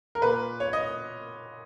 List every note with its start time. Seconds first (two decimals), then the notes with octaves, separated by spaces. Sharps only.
0.15 A#4
0.22 A#2 B4
0.60 C#5
0.73 D#5